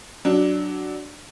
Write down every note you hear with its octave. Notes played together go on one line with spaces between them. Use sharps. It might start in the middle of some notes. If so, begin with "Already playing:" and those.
F#3 D4